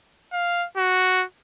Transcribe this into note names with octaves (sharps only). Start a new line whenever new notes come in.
F5
F#4